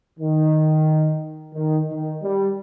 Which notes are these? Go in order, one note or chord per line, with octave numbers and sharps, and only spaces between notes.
D#3
D#3
D#3
G3